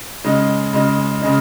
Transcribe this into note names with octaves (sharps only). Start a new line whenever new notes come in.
C#3 G#3 D#4
C#3 G#3 D#4
C#3 G#3 D#4